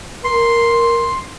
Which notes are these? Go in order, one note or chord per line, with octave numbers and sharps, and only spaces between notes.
A#4 C6